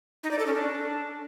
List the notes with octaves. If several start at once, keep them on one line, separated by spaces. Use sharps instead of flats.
D#4
D5
A4
C#4
D4